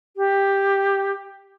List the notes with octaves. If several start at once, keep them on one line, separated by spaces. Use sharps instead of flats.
G4